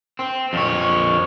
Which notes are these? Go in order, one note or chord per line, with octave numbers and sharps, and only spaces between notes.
C4
F2 C#5